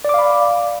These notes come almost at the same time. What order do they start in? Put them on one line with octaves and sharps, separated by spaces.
D5 D6 F5 B5